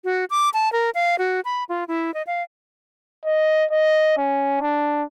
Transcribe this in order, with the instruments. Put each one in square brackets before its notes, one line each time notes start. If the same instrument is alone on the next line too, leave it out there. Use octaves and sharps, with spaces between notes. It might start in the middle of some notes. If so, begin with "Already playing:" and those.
[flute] F#4
D6
A5
A#4
F5
F#4
B5
F4
E4
D#5
F5
[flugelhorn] D#5
D#5
C#4
D4